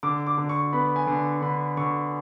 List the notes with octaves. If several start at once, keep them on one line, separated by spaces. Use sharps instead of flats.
D3 D6
D6
D3
C#6
B3 B5
G#5
D3
D3 B5
D3 C#6